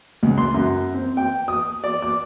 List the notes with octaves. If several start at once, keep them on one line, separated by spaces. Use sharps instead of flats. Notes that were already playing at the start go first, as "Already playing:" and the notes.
C#2
C6
F#2
C4
G5
D#6
D5
D6